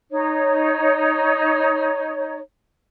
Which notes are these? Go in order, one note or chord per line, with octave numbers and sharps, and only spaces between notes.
D#4 C#5